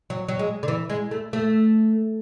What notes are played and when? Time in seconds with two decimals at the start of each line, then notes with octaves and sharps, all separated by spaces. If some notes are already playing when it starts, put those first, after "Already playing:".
0.10 F#3
0.28 F#3
0.39 G#3
0.63 D3
0.68 E3
0.90 G#3
1.11 A3
1.33 A3